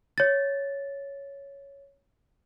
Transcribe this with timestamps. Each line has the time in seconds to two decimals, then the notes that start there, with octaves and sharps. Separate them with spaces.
0.18 C#5 A6